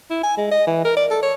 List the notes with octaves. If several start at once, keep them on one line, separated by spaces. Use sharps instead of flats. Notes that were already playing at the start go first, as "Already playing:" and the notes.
E4
G#5
G#3
D#5
E3
A#4
D5
A4
C#5